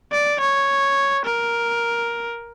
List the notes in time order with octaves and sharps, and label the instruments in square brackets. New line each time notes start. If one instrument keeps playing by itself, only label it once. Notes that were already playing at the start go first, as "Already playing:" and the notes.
[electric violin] D5
C#5
A#4